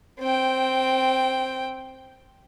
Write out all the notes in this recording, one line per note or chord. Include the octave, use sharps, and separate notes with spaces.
C4 G5